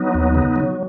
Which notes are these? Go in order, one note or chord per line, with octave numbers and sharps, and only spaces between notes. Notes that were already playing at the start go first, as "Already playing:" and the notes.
Already playing: F#3 B3 D#4
D#2
C#3
F#3